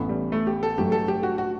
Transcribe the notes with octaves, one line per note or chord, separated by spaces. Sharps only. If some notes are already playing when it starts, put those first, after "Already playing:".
Already playing: A1 A2 E3 B3
G3
A3
G4
A4
G2 F#3 A3 G4
A4
G4
F#4
F#4